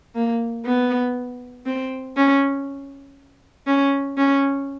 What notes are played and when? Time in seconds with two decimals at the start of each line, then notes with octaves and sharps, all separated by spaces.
0.15 A#3
0.65 B3
1.66 C4
2.17 C#4
3.67 C#4
4.17 C#4